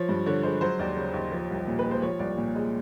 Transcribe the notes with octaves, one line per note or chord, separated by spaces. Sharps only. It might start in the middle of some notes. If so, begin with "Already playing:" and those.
Already playing: F3 C#5
G2
D3 C#5
G#3 C5
F#3 C5
D#2 D5
C#3 C#5
D#2
F3
C2
A#2
B4
G#3
C5
F3 C#5
C2 D5
A#2
G#3